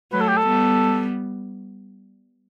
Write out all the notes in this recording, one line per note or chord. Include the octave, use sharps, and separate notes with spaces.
F#3 A3 B4
A4
G4
A4
G3 B3